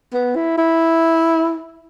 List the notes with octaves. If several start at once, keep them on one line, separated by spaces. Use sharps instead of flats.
B3
E4
E4